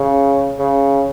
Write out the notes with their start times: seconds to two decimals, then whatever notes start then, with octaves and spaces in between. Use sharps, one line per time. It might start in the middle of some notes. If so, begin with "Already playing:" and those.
Already playing: C#3
0.59 C#3